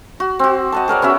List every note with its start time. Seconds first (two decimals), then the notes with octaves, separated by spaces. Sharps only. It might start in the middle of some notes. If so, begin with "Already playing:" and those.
0.20 F#4
0.39 C4 F#4
0.72 D#5 F#5 A5
0.88 G#4 A#4 C#5 D5
1.02 B3 C#4 F#4 E5